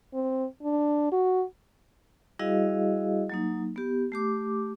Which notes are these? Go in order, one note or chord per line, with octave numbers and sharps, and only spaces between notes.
C4
D4
F#4
G3 E4 F#4 G#4 D#5 F5
F#3 A#3 D#4
B3 G4
A3 G4 D6